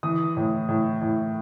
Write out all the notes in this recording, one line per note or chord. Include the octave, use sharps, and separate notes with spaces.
E3 D#6
A2
A2
A2